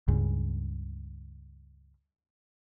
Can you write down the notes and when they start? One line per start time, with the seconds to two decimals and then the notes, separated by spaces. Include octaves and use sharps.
0.08 C#2 G2 C#3